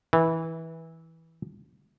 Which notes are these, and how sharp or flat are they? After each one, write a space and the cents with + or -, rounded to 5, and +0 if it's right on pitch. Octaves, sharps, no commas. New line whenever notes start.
E3 -15